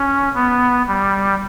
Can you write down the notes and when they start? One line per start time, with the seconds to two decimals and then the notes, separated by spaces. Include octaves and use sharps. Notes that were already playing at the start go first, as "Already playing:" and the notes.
Already playing: C#4
0.35 B3
0.87 G3